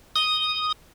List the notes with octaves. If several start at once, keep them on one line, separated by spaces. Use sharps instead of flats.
D#6